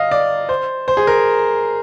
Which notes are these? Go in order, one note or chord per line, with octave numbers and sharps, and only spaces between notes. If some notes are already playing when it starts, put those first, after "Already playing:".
Already playing: D#5 F5
D5
C5
C5
G#4
A#4